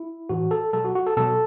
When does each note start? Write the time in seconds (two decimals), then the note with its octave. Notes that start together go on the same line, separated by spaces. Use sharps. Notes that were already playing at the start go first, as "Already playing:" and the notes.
Already playing: E4
0.29 A2 E3 F#4
0.51 A4
0.73 B2 F#3 A4
0.84 F#4
0.95 F#4
1.07 A4
1.17 B2 F#3 A4